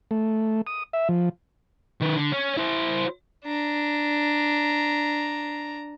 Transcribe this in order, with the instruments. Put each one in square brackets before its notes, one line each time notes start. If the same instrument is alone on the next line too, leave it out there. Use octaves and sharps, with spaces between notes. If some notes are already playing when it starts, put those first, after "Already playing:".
[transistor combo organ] A3
D#6
E5
F3
[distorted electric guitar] D#3 B4
D3
C#4
E4 C5
[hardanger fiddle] D4 A#5